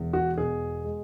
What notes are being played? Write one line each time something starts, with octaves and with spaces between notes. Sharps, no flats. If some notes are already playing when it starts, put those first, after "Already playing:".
Already playing: E1 E2
F#4
B2 G#4
G#3